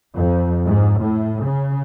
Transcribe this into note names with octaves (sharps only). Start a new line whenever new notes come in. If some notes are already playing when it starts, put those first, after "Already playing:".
F2
G#2
A2
C#3